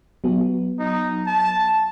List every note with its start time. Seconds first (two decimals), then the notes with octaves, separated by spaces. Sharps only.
0.24 F#3 B3 F#4
0.79 D#4
1.27 A5